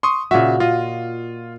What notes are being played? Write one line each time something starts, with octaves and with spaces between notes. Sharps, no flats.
C6 C#6 D#6
A#2 C#3 F#4 E5
F4 D#5